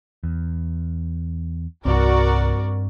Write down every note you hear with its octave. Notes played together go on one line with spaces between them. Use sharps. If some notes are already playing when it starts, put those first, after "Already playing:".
E2
C2 G2 C4 F#4 A#4 D5